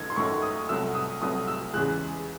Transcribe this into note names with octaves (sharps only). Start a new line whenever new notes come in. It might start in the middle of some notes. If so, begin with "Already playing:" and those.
Already playing: F#2 D#3 F#3 A3 G#6
C6
F#2 D#3 F#3 A3 C#6
D#6
C2 C3 F#3 A3 E6
D#6
C2 C3 F#3 A3 D#6
E6
E2 C#3 E3 G#3 F#6